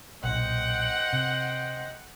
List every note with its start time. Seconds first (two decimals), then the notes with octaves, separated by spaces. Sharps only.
0.23 B1 A#2 C5 D#5 F#5 G5
1.13 C3